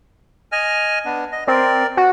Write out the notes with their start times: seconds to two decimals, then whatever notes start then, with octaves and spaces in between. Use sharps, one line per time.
0.52 D#5 G#5 F6
1.05 B3 D4
1.32 D#5
1.47 C4 A#4 D5
1.97 F#4